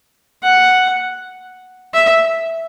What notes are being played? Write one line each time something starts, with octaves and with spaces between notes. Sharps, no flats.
F#5
E5